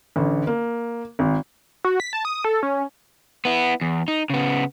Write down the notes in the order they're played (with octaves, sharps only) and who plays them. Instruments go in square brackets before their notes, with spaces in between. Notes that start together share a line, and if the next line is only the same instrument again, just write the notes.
[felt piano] A1 D3
A#3
G#1
[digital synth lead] F#4
B6
A5
D#6
A4
C#4
[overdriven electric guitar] B3 E4
E2
D#4
C#3 B3